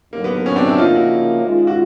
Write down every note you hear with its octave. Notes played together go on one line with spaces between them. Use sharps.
D#2 D3 F#3 A#3
B3
A#3
B3 C#4
C4 D4
D4 E4
C#3 F3 A#3 D#4 F4
E4 F#4
D#3 G#3 C#4 F4
F#4